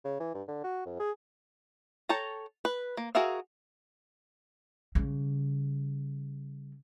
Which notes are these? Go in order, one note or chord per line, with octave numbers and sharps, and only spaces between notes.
C#3
E3
G2
D3
F#4
F2
G#4
A4 C#5 G5 A5 A#5
B4
A#3
F#4 G#4 A#4 E5 F5
C#3 G3